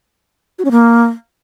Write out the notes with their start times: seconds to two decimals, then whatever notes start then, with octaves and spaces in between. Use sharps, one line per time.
0.59 F#4
0.65 C#4
0.71 A#3